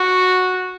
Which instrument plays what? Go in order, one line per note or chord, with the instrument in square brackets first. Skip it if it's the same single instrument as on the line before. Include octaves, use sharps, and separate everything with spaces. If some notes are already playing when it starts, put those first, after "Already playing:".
Already playing: [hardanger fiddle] F#4